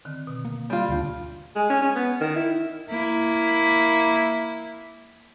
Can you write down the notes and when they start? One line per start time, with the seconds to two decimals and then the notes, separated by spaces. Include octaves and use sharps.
0.05 D3 D#3 C4
0.27 B2
0.45 A#3
0.70 G3 F4
0.89 D2 G2 D4 G6
1.56 G#3
1.70 C#4
1.82 C#4
1.95 B3
2.21 D#3
2.36 E4
2.89 A#3 E4